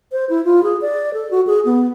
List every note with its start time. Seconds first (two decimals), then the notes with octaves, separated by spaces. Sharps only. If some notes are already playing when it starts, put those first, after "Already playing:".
0.12 C5
0.30 E4
0.45 F4
0.63 G#4
0.82 D5
1.14 A4
1.31 F#4
1.47 G#4
1.65 B3